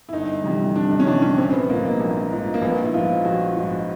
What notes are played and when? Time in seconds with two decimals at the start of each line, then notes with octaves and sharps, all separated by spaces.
0.09 E4
0.13 G1 D#4
0.44 F2 C3 E3 G3
0.75 G1 D4
0.91 D#4
1.00 C#4
1.06 F2 C3 E3 G3 D4
1.22 C#4
1.38 A#1 C4
1.53 B3
1.69 G#2 A#3
1.73 F3
1.85 A#3
2.00 A#1
2.31 G#2 F3
2.54 A#3
2.62 A#1 B3
2.85 E4
2.94 G#2 F3 F4
3.25 A#1 F#4
3.56 G#2 F3